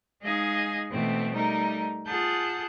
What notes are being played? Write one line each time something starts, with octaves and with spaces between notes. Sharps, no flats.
G#3 D#4 G#4 D#5 F5 G#5
B2 E3 A3 C4
G3 A3 D#4 A#4
F4 G#4 F#5 A5 G6